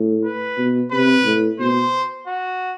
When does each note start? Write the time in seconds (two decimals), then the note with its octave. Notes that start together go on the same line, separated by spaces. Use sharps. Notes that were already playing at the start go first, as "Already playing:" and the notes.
Already playing: A2
0.24 B4
0.58 B2
0.92 C3 B4
1.25 A2
1.59 B2 C5
2.27 F#4